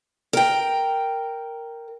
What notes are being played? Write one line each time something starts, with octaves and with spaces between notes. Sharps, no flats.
A#4 G5